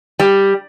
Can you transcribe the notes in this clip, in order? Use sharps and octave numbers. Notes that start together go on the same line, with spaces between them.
G3